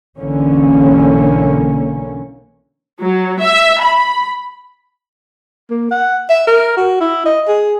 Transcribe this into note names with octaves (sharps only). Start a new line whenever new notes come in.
B1 D3 E3 A#3 C#4
F#3
E5
B5
A#3
F#5
E5
A#4
F#4
E4
D#5
G#4